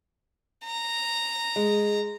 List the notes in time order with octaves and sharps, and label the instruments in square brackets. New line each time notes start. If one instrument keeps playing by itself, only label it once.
[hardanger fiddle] A#5
[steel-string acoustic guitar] G#3